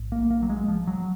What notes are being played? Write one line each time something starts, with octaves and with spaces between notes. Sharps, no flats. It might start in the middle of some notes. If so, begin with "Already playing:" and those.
Already playing: A#1 G#2
A#3
A#3
F#3
G#3
F3
F#3